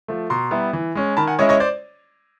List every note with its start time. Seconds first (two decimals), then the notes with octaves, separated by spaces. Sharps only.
0.08 F3 A3
0.30 B2 A#5 C6
0.51 G3 B3 E4
0.73 E3
0.95 G#3 C#4
1.17 D#3 A5 B5
1.27 F#5 G#5
1.39 G#3 C#4 E4 C#5 D#5
1.49 C#5 D#5
1.60 C5 D5